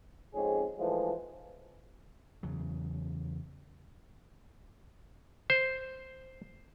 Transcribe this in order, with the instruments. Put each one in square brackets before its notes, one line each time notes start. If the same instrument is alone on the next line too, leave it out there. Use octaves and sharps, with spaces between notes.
[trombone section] F2 G#2 C4 C#4 G#4
G#2 E3 F3 G#3 A3
[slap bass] E2 C#3 F#3
[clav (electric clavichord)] C5